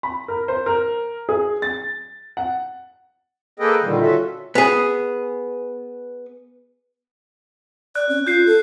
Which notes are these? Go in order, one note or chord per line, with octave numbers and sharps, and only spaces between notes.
B5
A#4
C5
A#4
G#4
A6
F#5
A#3 G#4 A4 B4 D#5 G5
A#2 D3 D#3 G3
C#4 F4 F#4 A4 E5
B3 G#4
D5 F#6
C#4
F4 G6 C7
A4